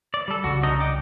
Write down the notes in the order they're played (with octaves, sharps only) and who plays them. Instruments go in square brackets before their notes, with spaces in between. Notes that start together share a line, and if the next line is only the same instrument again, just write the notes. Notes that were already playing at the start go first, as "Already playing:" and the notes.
[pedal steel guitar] D5
G3 A4
[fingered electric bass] C2 C#3 [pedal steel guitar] F#4
[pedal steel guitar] D4 D#4 D#5
D#5 G5 D6